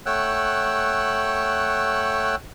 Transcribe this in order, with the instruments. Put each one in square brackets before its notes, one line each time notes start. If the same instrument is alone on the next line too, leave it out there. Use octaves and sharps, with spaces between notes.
[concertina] A3 C#5 F#5 G5 E6 F#6